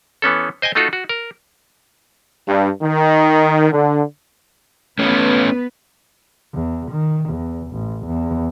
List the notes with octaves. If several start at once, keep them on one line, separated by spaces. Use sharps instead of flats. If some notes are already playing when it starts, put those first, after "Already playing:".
E3 B3 C#4 A4
C5 D#5 G5 G#5
A3 D#4 F4 F#4 A4
F#4
A#4
G2
D#3
D3
A3 B3 C#4 B4
E2
D#3
E2
A1
E2